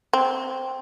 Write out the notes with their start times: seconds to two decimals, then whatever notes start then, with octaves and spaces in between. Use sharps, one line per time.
0.13 C4